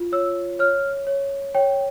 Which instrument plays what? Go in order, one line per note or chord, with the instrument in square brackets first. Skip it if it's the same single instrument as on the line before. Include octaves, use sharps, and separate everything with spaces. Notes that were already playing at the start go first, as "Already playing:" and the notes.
Already playing: [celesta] F4
C#5 E6
C#5 F6
C#5
C#5 G5